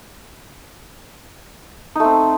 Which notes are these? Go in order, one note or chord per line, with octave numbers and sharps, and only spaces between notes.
A3 C4 D#4